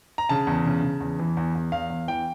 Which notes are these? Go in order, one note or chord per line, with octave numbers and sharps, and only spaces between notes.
A#5
C#3 A5
E2
C#3
C#3
E2
E3
E2
E2
E2 F5
E2
E3 G5